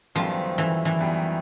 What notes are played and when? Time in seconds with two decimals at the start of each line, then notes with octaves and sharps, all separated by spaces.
0.15 F#2 D#3 F3 G3 B3
0.58 E3
0.85 E3
1.00 F#2 D#3 G3 B3